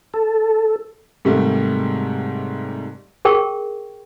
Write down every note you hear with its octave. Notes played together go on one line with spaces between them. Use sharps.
A4
G#2 C3 D#3 G3 A3
G#4 A#4 G5 C#6